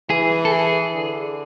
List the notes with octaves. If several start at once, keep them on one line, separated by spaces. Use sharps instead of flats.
E3 G#4
A4
G#4
D3